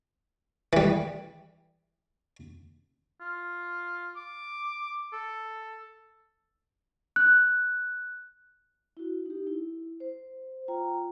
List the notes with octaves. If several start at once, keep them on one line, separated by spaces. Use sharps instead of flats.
E3 G3
F4
D6
A4
F#6
E4 F#4
D#4 G4
E4
C5
F4 G5 A#5